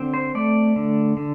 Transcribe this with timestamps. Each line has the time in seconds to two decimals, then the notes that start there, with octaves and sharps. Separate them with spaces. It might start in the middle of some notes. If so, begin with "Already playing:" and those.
Already playing: D3 C4
0.14 C5
0.35 A3 D5
0.76 D3
1.17 D3